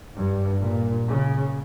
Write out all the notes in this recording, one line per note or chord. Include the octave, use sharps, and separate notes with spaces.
G2
A#2
C#3